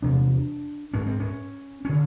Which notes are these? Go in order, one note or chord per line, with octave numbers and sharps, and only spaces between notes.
E2 C3 D4
G#2 C#4
C4
C#4
D3 C#4